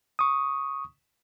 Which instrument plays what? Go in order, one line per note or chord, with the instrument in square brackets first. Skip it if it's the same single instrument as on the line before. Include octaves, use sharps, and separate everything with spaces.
[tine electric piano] C#6 D#6